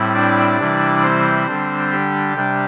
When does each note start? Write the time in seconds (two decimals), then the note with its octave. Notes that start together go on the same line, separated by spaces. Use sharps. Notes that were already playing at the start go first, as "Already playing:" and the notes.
Already playing: A2 G3 C4 E4
0.14 D4 D5
0.59 C3 E3 G3 E4
1.03 C4 C5
1.47 D3 G3 D4
1.91 G4
2.35 C3 G3 D4